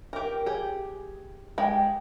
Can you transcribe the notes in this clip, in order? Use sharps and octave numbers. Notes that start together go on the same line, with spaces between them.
G4 A#4
G4 G#4
G#3 G4 G5